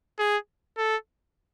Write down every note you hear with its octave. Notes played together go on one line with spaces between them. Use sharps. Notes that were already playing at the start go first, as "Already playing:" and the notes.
G#4
A4